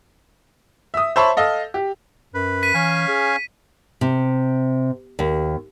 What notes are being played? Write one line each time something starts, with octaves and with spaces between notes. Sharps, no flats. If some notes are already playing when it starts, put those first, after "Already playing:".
E5 D#6
C5 C#5 E5 A5 B5 C#6
A4 D#5 F5
G4
F#2 B4
B6 D#7
E3 C#4 F5 G#5
G#4
C3
D#2